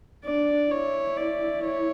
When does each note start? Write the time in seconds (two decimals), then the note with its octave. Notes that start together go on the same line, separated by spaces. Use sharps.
0.24 D4 D5
0.70 E4 C#5
1.17 D5
1.63 C#5